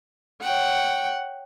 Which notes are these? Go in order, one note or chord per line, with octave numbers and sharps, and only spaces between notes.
C#5 F#5 G5